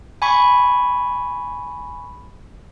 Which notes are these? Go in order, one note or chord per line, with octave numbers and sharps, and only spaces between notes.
G#5 B5 C#6